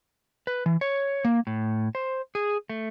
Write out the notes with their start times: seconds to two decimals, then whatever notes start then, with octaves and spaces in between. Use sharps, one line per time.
0.47 B4
0.66 E3
0.81 C#5
1.25 A#3
1.47 A2
1.95 C5
2.35 G#4
2.70 A3